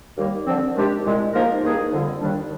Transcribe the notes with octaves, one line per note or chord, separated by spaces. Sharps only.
D#2 D#3 G3 A#3
D3 F3 C4
C3 D#3 G#3 D4 G4
C2 A#2 G#3
G#2 F3 A#3 D#4 A#4
G2 D#3 A#3 D#4 G#4
F2 D3 G3
D#2 D#3 G3 D4